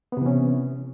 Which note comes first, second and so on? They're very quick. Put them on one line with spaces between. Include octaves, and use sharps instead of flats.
B3 C3 E3 C#4